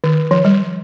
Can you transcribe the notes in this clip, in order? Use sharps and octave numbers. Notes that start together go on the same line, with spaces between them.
D#3
F3
G3